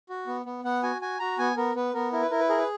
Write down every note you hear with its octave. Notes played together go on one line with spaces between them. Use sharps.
F#4
B3
B3
B3 F#5
F#4 G#5
F#4 G#5
F#4 A#5
B3 G#5
B3 A#4
B3 B4
B3 A#4
E4 A#4
B4
E4 A#4
B4
G#4 A#4
B4